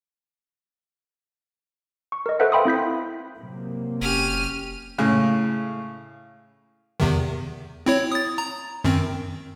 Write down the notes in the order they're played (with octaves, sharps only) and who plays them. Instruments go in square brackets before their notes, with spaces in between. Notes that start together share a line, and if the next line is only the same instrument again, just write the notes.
[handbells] C#6
A#4 D#5
A4 B4 C5 E5 F#5
E5 F5 G5 B5 C6 D#6
C4 E4 G6 B6
[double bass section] C3 F#3 A#3
[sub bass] F1 [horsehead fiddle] C#4 G4 [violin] F6 D#7
[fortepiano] A2 C#3
[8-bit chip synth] E2 C3 D#3
C4 E4 C#5
D#6 A6
A#5
F#2 D#3 C4